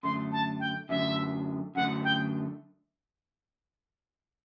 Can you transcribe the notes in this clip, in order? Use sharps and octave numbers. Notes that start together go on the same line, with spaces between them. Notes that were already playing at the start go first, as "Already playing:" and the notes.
F#2 D3 A3 C6
A5
G5
F#2 D3 A3 E5
F#2 D3 A3 F#5
G5